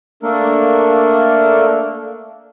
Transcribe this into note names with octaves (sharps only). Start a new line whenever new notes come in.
A3 A#3 D4 A4 A#4